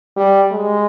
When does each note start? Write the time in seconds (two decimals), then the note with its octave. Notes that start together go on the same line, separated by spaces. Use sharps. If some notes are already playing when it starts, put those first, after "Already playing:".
0.16 G3
0.52 G#3